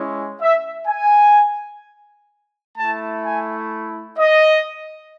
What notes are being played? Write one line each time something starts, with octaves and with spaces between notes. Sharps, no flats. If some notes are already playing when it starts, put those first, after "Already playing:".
Already playing: G#3 C#4 E4
E5
G#5
A3 E4 A5
G#5
D#5